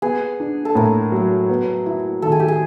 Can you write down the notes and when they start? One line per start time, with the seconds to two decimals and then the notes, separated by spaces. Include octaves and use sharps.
0.02 B3 G#4
0.40 D4
0.65 A4
0.75 A2 A#4
1.12 F#3
1.49 B3
1.86 E4
2.22 D#3 A4
2.32 G#4
2.40 G4
2.48 G#4